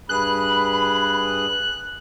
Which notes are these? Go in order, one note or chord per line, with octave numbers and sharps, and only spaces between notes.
G2 G#4 B5 F#6